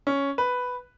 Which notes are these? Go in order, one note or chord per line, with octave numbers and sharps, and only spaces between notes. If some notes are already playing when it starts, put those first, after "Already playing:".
C#4
B4